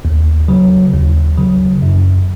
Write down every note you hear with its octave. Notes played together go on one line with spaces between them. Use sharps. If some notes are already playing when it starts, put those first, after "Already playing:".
D#2
C#3 F#3
D#2
C#3 F#3
F#2